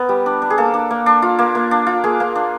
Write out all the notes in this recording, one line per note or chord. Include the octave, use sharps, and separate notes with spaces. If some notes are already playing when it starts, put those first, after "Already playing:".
Already playing: B3 A#4
G3
D4
D4
G#4
A#3 A4
D4
A#3
D4
F4
A#3
A#3
D4
F4
A#3 G#4
A#3
D4